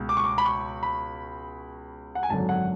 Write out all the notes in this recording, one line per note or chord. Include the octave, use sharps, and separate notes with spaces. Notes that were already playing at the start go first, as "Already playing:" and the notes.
Already playing: C#2 B2
D6
C#6
D6
B5
C#6
B5
F#5
G#5
G#1 F#2 D3 F#3 A5
F#5